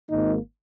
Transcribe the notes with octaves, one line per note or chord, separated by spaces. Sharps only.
G#1 G#2 D#3 A#3 D#4